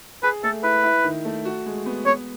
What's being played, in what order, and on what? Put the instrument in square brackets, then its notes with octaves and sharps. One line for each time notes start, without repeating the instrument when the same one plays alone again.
[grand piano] G#4 [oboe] B4
[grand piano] A3 [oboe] A4
[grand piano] E4 [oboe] B4
[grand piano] E4
D#3
A3
F#4
G#3
B3
[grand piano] B3 [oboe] C#5